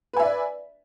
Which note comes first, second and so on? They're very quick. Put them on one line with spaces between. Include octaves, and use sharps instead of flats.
B4 G#5 E5 D5